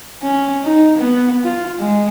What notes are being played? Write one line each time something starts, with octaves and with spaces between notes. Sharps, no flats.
C#4
D#4
B3
F4
G#3